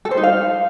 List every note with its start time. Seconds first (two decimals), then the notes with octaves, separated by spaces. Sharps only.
0.05 A4
0.11 C5
0.17 D#4
0.23 F5